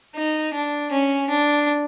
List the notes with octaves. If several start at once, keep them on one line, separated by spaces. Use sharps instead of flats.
D#4
D4
C#4
D4